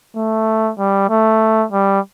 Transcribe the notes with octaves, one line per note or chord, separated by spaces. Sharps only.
A3
G3
A3
G3